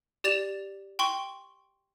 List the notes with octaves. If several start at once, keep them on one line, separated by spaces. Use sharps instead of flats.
G4 D5 A6 E7 F7
G5 C6 C#6 G7